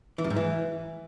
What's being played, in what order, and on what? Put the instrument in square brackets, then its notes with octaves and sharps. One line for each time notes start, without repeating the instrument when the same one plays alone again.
[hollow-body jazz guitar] E3
F#2
G#2
E3